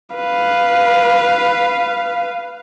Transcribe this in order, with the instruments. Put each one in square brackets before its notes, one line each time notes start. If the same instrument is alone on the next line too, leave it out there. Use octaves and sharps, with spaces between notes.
[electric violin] B4 F5